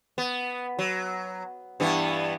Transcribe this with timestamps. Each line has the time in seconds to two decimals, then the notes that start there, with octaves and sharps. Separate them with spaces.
0.18 B3
0.79 F#3
1.80 G2 E3 B3